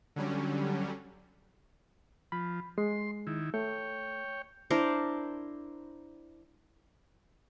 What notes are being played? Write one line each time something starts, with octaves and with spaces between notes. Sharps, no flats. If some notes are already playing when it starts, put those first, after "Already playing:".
D3 F#3 G3 C#4
F3 B5
G#3 C6
D#3 E4
A3 C#5 G5
D4 E4 A#4 C5